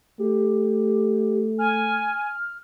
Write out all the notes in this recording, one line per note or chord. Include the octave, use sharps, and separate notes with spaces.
A3 G4
G#5 F6